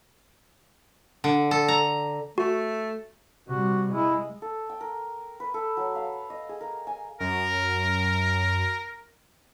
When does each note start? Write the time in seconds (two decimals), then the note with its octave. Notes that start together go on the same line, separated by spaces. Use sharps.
1.24 D3
1.51 A4
1.68 A#5
2.38 A3 F#4
3.48 C3 G3 F#4
3.91 G#3 E4
4.42 A4
4.70 G5
4.81 A#4
5.40 B4
5.54 A4
5.77 F#3
5.95 F5
6.30 D#5
6.49 G#4
6.61 A#4
6.87 G#5
7.20 F#2 A#4